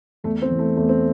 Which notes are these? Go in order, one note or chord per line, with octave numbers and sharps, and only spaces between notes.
E2 A3
C4
E3
A3
E2 A3
C4